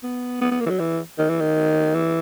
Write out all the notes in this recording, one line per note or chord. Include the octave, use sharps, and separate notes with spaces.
B3
B3
B3
A#3
E3
F#3
E3
D#3
E3
D#3
E3